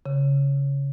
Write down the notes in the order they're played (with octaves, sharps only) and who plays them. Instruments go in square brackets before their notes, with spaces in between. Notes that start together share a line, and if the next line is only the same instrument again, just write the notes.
[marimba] C#3